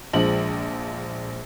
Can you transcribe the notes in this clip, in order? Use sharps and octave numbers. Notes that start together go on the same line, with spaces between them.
A#1 F3 G#3 F#7